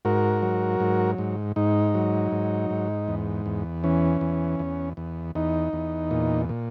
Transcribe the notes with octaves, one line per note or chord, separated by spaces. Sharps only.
G#2 F#4 A#4
F#3
G#2
G#2
G#2 D#4
F#3
G#2
G#2
E2
E2
E3 C#4
E2
E2
E2
E2 D#4
E2
A#2
A#2